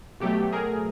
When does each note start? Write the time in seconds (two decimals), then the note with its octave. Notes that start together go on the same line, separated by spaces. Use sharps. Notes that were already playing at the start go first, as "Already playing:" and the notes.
0.20 B2 F#3 A3 G4 A4
0.53 G#4 A#4